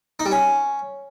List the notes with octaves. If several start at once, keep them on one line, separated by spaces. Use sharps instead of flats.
D#4
G3
C#4